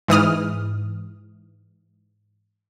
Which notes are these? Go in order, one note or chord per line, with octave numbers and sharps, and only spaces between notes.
G#2 E3 D#6 F6